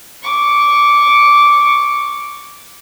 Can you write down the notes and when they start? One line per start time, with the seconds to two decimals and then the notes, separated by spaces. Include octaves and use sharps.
0.23 C#6 D6